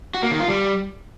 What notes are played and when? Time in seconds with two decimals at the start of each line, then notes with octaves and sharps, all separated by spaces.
0.14 F#4
0.23 A#3
0.31 D#3
0.40 F4
0.48 G3